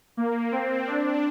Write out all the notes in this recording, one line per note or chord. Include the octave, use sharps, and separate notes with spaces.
A#3
C4
D4